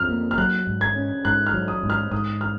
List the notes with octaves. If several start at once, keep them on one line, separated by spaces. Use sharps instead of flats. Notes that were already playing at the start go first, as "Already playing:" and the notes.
Already playing: F2 F6
A#3
F6
F#3 F#6
G#2
G#6
C#4
G#2 F#6
F6
F#3
D#6
G#2
F6
G#2 D#6
F6